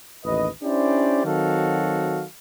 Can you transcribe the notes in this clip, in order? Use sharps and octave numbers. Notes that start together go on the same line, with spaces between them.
A1 D#2 B4 D#5
C#4 D4 E4 G4 C5 D5
D#3 F#3 C4 F#4 A4 F5